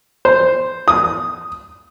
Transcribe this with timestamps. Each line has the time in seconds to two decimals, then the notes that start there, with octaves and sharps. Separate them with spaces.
0.25 C5
0.88 D#6